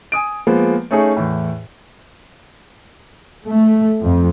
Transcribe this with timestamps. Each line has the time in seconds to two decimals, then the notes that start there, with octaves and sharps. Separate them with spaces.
0.12 G#5 D#6 D7
0.47 F3 G#3 A#3 B3
0.91 A3 C#4 D#4 G#4 C#5
1.17 E2 A2
3.46 A3
4.01 F2